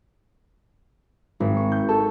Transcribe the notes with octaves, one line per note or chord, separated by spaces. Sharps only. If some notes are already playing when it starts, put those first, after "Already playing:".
G#1
C#6
G6
A4